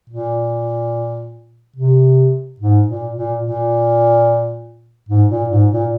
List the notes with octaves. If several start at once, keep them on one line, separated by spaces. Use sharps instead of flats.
A#2
C3
G#2
A#2
A#2
A#2
G#2
A#2
G#2
A#2